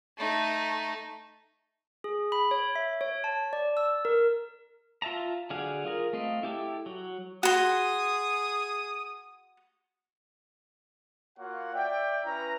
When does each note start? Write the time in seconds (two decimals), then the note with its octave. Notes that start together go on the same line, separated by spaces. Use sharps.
0.17 A3 D#4
2.04 G#4
2.32 B5
2.51 C#5
2.76 E5
3.01 C#5
3.24 A5
3.53 D5
3.77 E6
4.05 A#4
5.02 F4 E5 A5 A#5
5.50 D3 F#3 G#4 F5
5.85 F4 G#4 A#4
6.13 A3 C4 D#5 F5
6.43 E4 G4 A4
6.86 F#3
7.43 F#4 G#4 C6 D#6
11.38 A#3 F4 F#4 C#5 F#5
11.74 D5 E5 G5
12.24 C#4 E4 B4 A#5